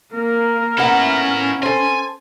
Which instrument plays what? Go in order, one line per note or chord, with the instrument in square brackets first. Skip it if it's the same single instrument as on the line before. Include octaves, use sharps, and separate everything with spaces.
[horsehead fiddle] A#3 [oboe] A#4
[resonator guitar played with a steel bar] A#3 B3 F#5 [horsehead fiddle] C#4 [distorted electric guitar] E4 A4
[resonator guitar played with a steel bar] A4 C5 [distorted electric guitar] G#5